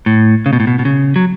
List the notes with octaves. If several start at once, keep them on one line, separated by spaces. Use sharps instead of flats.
A2
C#3
B2
A2
B2
B2
C#3
F#3